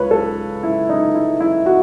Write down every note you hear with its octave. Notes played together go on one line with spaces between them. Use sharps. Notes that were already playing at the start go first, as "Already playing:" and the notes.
Already playing: C#2 B4 C#5
A4
E4
D#4
E4
E4
F#4